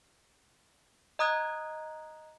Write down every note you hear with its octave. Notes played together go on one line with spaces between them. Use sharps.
D#5 A#5 D#6 F#6 G#6